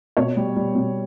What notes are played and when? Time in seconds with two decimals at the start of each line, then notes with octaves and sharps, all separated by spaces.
0.17 B2 C#5
0.37 G3
0.56 G3
0.75 B2